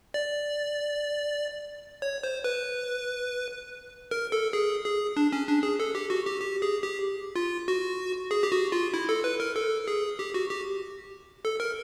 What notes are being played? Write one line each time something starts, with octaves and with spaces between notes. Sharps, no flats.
D5
C#5
C5
B4
A#4
A4
G#4
G#4
D4
C#4
D4
G#4
A4
G4
F#4
G4
G4
G#4
G4
F4
F#4
G#4
G4
F#4
F4
E4
A4
B4
A#4
A4
G#4
G4
F#4
G4
A4
A#4